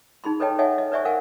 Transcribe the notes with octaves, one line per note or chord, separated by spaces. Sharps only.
D#4 G#4 B5 C6
A4 B4 C#5 D#5 G5 A5
A4 C#5 D#5 E5 F#5 G#5
D#5
B4 C5 D5 E5 G#5 C#6
A#4 B4 F5 F#5 G#5